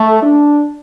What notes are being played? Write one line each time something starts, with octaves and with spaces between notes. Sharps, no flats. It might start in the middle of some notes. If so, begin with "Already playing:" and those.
Already playing: A3
D4